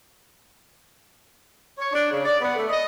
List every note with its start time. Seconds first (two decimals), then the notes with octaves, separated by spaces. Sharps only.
1.78 C#5
1.92 D4
2.11 C#3
2.25 D5
2.41 B3
2.56 A3
2.69 D#5